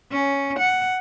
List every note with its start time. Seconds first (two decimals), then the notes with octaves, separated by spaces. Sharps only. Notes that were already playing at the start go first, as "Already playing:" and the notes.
0.12 C#4
0.59 F#5